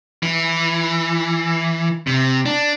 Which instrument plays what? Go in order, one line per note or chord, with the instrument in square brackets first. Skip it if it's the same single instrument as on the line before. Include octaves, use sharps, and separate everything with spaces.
[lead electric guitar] E3
C3
D4